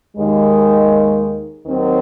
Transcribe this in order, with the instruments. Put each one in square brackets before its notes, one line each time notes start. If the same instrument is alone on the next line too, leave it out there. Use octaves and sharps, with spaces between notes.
[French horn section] D#2 D#3 G#3
D#2 D#3 F#3 C4